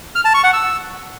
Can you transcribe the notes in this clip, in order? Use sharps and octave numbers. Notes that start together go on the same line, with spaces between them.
F6
A5
C#6
F#5
E6